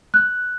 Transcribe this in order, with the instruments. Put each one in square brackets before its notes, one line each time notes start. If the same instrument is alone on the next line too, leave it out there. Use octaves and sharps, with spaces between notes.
[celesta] F#6